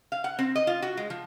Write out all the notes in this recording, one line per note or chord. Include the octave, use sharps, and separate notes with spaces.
F5
F#5
C4
D#5
F4
F#4
G#3
F3